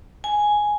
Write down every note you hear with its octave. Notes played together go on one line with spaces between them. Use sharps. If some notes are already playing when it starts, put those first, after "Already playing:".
G#5